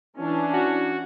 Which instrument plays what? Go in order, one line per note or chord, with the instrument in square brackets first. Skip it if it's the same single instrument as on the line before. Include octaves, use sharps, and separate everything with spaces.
[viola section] E3 C#4 D4
[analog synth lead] F#4